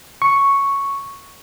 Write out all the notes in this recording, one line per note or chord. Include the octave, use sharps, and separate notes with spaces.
C#6